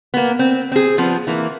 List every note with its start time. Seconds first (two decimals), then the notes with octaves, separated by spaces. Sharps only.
0.14 A#3 B3
0.39 C4
0.72 C4 G#4
0.98 F3 B3 C4
1.27 E3 A#3